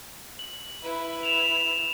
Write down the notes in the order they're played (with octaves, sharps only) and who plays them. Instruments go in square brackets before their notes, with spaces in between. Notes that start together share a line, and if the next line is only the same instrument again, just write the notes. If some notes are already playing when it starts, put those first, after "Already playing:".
[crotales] F#7
[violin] E4 B4
[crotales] E7 F7